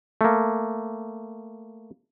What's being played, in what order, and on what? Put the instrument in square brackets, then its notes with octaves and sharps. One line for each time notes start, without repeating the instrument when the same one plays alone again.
[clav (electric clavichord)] A3 A#3